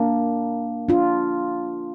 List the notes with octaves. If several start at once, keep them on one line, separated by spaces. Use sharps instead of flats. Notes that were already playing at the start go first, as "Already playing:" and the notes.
Already playing: A#3 D4
D4 F4